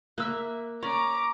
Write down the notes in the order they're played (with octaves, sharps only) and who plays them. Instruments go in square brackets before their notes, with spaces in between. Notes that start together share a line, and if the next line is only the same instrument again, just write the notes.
[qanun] A#3 [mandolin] E5 E6 F#6
[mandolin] C#4 [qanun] D5 [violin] A#5 D6